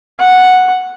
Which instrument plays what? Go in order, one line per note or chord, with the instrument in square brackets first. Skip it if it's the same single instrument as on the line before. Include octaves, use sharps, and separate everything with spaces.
[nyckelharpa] F#5